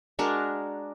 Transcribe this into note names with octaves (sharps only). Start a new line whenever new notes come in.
G#3 D4 F#4 A#4